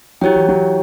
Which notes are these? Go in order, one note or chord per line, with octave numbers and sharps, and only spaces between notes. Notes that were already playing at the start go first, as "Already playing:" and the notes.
F#3 E4 G4 C#5 G5
E3
F#3